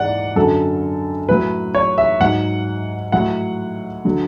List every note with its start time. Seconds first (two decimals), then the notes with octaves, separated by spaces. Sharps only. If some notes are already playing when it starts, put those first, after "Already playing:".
Already playing: G#2 E3 D5 F#5
0.36 F#2 D3 F#3 A4
1.29 A2 F#3 B4
1.75 C#5
1.98 E5
2.20 G#2 F#3 F#5
3.12 A2 F#3 F#5
4.05 D3 F#3